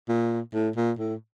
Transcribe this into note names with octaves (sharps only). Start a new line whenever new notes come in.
A#2
A2
A#2
A2